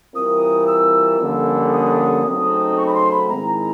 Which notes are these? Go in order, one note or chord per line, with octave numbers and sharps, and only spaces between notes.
E3 G3 C4 F4 A#4 D#6
E6
F2 D3 G3 A#3 C#4
D#6
C#3 F#3 A3 C4 D#4
C#6
B5
C6
B5
G#2 D#3 G#3 C4 E4 A#5